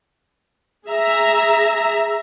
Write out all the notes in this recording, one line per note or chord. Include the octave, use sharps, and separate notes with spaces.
G#4 E5 A#5